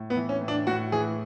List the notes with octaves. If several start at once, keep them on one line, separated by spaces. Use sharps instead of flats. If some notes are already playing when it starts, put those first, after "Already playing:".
Already playing: A2
B3
E3
C#4
A2
D4
A2 F#4
E3 G#4